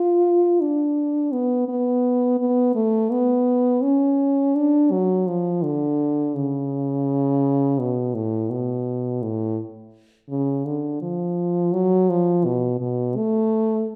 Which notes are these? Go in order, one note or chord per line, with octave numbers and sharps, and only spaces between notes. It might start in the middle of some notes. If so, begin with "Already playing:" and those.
Already playing: F4
D4
B3
B3
B3
A3
B3
C#4
D4
F#3
F3
D3
C#3
B2
A2
B2
A2
C#3
D3
F3
F#3
F3
B2
B2
A3